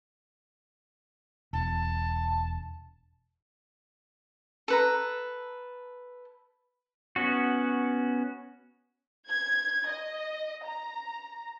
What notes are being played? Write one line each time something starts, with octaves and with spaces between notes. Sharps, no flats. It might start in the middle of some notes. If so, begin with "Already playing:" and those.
E1 A5
A4 B4 A#5
B3 C#4 F#4
G#6
D#5
A#5